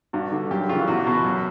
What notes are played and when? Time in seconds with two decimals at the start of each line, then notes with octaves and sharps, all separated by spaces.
0.13 G2 F#4
0.32 D3
0.51 F#2 G4
0.69 C#3 E3 F4
0.88 E2 F#4
1.07 B2
1.24 F#2